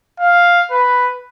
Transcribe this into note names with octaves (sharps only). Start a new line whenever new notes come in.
F5
B4